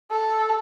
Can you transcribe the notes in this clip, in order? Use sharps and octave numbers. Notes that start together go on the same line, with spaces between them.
A4